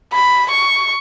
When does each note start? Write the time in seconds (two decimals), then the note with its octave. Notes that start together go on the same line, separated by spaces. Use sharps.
0.14 B5
0.51 C#6